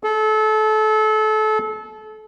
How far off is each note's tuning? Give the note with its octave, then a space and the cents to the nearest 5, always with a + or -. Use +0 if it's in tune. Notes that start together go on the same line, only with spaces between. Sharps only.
A4 -30